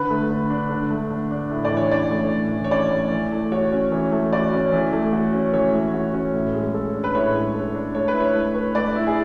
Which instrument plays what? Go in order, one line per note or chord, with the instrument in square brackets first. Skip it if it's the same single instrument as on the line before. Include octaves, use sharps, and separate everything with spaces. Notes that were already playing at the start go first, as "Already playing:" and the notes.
Already playing: [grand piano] D3 [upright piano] B4
[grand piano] A3
D3
D4
D3
A3
D3
D4
A2
[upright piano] D5
[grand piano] E3
[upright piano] C#5
[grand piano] C#4 [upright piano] D5
[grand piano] A3
A2
E3
[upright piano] C#5
[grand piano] C#4 [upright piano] D5
[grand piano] A3
E3
A3
[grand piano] F#4 [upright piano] C#5
[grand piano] C#4
E3
A3
[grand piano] F#4 [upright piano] D5
[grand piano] C#4
E3
A3
F#4
C#4
[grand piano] E3 [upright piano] C#5
[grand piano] A3
F#4
C#4
A2
G#3
A4
D4
[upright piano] B4
[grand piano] A2 [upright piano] C#5
[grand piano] G#3
A4
D4
[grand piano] A3 [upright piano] C#5
[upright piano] B4
[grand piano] E4
[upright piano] C#5
[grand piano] A3
B4
[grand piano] A3 [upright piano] D5
[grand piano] E4
[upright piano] G#4